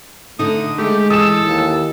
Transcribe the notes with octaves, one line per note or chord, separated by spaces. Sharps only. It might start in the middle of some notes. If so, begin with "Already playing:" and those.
D3 A3 D#4 D#6
G#3 A3 G4
E3 A4 D#6 E7
D#2